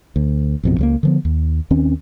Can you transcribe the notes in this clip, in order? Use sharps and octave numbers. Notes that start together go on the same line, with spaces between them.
D2
A1 F2 B2
C#2 F#3 A#3
D3 F3 B3
D#2
D#2 D#3 C4 C#4